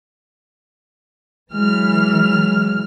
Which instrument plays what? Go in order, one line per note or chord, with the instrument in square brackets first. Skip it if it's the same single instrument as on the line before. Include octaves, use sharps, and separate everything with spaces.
[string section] E3 F6 [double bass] F#3 G#3